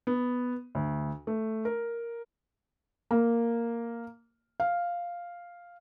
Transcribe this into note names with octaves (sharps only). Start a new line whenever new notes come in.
B3
D2
A3
A#4
A#3
F5